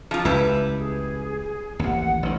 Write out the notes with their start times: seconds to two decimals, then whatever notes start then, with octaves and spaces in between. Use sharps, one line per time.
0.11 F3 F4
0.25 C#2 G3 E4 B4
0.77 G#4
1.79 A1 D#2 F#5
2.23 A1 D#3